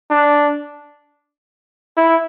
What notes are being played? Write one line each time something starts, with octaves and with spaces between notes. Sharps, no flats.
D4
E4